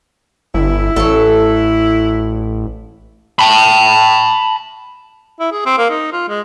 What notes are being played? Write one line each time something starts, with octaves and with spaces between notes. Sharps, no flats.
G1 E4
A1 F#3 A4
A5 B5
E4
G#4
C4
A#3
D#4
F4
G#3